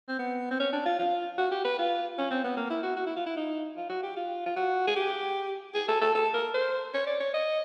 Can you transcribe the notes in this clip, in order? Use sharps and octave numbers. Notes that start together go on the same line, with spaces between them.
C4
B3
C4
C#4
D4
F4
F4
F#4
G4
B4
F4
C#4
C4
B3
A#3
E4
F#4
F#4
E4
F4
E4
D#4
F4
F#4
G4
F4
F4
F#4
G#4
G4
G#4
A4
A4
A4
A#4
C5
C#5
D5
C#5
D#5